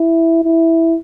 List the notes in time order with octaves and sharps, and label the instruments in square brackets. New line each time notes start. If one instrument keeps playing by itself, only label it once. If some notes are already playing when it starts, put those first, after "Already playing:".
Already playing: [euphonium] E4
E4